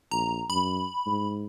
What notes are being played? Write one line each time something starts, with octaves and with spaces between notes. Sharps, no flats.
A#1 A#5
F#2 B5
G#2